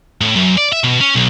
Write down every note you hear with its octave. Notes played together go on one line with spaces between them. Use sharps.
A2
F#2
D5
E5
B2
C#4
B1